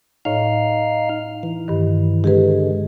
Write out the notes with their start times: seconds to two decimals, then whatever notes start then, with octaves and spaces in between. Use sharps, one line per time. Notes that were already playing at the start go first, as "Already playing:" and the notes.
0.25 A2 D#4 C#5 F5 F6
1.43 E3
1.68 G2 D#3
2.24 D3 G#3 G4 G#4 B4